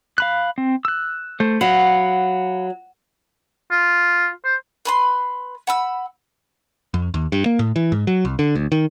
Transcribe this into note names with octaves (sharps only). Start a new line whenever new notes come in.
F5 B5 F#6
C4
E6 F#6
A3 C5
F#3 F5 F#5 B5
F4
C5
B4 B5 C6
F#5 B5 E6
F2
D#2
G2
A#3
A2
E3
G#2
F#3
C2
D3
D2
D#3